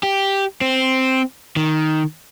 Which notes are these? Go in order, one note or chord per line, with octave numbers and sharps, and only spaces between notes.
G4
C4
D#3